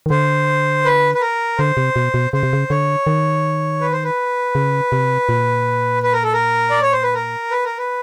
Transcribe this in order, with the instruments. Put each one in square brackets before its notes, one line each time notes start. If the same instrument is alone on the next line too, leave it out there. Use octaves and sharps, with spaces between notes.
[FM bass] D#3
[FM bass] D3 [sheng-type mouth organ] C5
[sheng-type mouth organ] B4
B4
A#4
[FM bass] D3 [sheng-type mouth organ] C5
[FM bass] C3
B2
B2
[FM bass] C#3 [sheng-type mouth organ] C5
[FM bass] C3
C#3
[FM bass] D3 [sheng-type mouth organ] C#5
[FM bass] D#3
[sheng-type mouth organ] B4
C5
B4
[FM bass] C#3
C3
A#2
[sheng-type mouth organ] B4
A#4
A4
A#4
D5
C#5
C5
B4
A#4
B4
A#4
B4